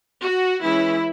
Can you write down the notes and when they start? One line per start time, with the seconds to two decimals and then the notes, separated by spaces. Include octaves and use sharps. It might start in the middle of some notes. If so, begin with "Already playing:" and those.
0.22 F#4
0.62 E3 G#3 C#4 E4